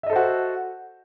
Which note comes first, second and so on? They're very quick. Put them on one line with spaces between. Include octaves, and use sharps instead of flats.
E5 D#5 A4 C5 F#4